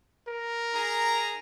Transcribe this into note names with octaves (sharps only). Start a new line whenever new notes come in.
A#4
D#4 G#4 A#5